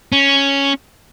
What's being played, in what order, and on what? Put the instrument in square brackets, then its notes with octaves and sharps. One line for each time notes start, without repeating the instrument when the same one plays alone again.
[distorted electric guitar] C#4